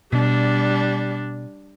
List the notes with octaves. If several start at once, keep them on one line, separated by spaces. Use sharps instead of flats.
B2 G3 D4